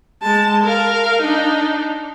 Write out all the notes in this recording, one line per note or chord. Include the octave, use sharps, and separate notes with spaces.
G#3 A5
A#4 F5
D4 D#4